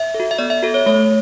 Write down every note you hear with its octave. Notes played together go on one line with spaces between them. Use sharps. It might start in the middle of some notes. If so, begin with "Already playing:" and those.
Already playing: E5
A4
F#4
E5
B3 D5
E5
F#4 A4
C#5
A3 C#5